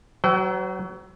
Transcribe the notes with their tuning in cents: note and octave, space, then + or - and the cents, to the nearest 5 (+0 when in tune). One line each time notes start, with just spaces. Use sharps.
F#3 +25 C5 -35 G5 -45